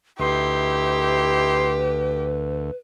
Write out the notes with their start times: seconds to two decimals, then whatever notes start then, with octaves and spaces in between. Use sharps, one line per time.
0.19 D2 D#4 E4 G4 B4 C6